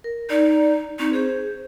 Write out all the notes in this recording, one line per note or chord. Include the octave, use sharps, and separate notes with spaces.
A#4
D#4 D5
C4 D#4 C#6
G#4 C5